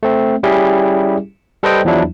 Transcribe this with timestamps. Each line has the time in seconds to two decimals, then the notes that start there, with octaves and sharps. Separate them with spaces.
0.03 A3 C4
0.43 G3 C#4 E4 G4 G#4
1.63 G3 A4 B4 C5 D#5 G5
1.85 E2 F3 F#3 D4 E4